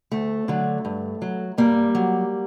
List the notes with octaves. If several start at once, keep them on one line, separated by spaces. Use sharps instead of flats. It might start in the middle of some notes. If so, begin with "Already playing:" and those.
D2 A3
D3 F#3
G2
F#3
G2 G3 A#3
F#3